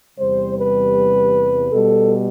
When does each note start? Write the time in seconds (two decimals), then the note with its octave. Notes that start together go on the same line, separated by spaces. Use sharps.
0.18 E2 C3 G3 C5
0.57 B4
1.72 B2 G3 A4